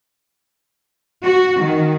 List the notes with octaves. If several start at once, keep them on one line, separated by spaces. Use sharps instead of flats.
F#4
D#3